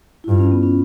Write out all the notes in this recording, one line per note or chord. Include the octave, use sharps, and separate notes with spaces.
E4
G2 F4
C#4
B3
C#4